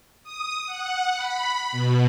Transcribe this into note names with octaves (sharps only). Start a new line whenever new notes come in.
D#6
F#5
B5
B2